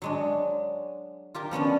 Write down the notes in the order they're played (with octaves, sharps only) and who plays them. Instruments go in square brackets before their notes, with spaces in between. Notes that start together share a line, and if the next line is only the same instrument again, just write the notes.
[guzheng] F#3 G#3 D4
F4 G4 A#4
F3 B3 C#4 D4